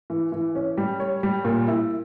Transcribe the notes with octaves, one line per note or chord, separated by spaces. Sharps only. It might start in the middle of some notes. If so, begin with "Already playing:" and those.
E3
E3
C#4
G3
C#5
G3
A#2
E4